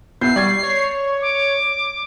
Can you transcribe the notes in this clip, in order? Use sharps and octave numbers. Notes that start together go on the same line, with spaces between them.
B1 B3 E4 G6 C7
G3 D5 C#6 G#6
C#5
D6